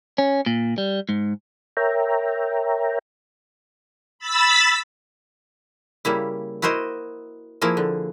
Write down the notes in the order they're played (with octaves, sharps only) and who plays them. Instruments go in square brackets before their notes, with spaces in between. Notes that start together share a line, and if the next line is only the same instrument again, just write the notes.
[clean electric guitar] C#4
A#2
G3
G#2
[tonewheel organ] A#4 C#5 E5 G5 A#5
[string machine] B5 E6 A6 B6
[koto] C#3 G3 A#3 E4
E4 F#4 A#4 C5 D#5
F3 A#3 E4 G#4 A#4
D3